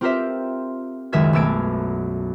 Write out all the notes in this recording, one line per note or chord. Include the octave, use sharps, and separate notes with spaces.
C4 F4 G4 A#4 C5 E5
C#2 F#2 D#3 A#4 E5 G#6
B1 A3 A5 E6 G#6 D7